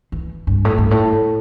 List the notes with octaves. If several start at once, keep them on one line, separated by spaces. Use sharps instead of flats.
E3
G2
A2
G2
A2